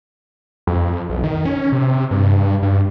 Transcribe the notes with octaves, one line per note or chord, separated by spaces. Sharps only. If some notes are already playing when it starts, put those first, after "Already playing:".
F2
B1
D#3
C#4
C3
G2
G2